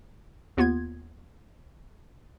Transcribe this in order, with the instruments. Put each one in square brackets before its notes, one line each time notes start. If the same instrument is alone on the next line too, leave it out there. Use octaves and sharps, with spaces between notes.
[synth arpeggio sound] D#2 B3 F4 G#6